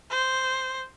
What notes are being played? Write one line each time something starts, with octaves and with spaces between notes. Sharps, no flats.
C5